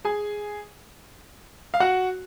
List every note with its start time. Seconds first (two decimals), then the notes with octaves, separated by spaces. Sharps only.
0.05 G#4 G#5
1.74 F5
1.80 F#4 F#5